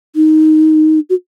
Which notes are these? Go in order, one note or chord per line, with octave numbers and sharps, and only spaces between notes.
D#4
F#4